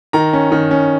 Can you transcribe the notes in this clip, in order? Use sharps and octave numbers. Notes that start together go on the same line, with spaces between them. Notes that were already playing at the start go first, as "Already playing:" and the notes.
D#3 A#5
C#4
D#3
C#4